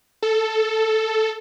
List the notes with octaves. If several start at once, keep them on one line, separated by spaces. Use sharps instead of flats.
A4